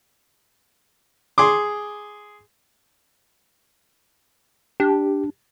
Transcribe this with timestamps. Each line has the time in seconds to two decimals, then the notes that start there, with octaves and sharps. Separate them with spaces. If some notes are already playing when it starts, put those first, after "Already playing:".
1.38 G#4 C6 D6
4.80 D4 G4